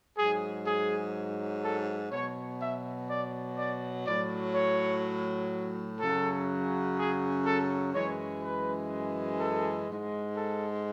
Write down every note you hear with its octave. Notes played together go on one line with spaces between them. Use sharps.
G#2 F#3 G#4
G#4
A4
B2 F#3 C#5
E5
D5
D5
A2 F#3 D5
C#5
F#2 C#3 F#3 A4
G#4
A4
F#2 E3 G#3 C#5
B4
A4
G#2 G#3
A4